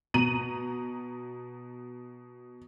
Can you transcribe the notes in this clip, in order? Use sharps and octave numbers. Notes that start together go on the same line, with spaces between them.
B2 A#5 D#7 F#7